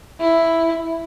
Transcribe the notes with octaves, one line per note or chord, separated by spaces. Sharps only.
E4